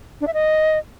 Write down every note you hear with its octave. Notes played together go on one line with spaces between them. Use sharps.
D4
E5
D#5